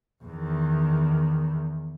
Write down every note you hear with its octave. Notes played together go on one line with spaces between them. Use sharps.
E2 D#3